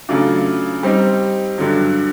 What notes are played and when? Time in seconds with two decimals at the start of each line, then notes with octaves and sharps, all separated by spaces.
0.09 C#3 F#3 A3 D4 F4
0.83 G3 C4 D#4
1.58 G2 D3 F#3